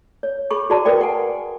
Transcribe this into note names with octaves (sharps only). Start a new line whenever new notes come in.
C#5
G#4 B5 C#6
F#4 G#4 C5 D5 A5 A#5
A#4 B4 D5 G5 C6
F#5 G#5